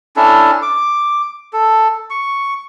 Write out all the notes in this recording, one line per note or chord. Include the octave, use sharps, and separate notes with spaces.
C#4 D4 E4 A4
D6
A4
C#6